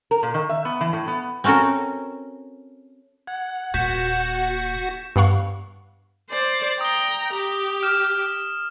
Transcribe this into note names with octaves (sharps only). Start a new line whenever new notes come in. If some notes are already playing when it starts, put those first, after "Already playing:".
A#4
A#2
D#3
E5
B3
E3
A2
B3
C4 C#4 F#4 A4 A#4
F#5 G#6
D#1 A#2 F#4 G6 B6 E7
G2 B3 F5 F#5 C#6
C5 D5
G5 A#5 D#6 G7
G4
F6 E7